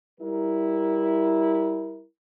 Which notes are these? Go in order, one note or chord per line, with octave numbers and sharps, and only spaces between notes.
G3 E4 A#4